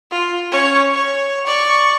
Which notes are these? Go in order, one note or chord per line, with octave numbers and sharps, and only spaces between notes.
F4
C#4 C#5
C#5
D5 C#6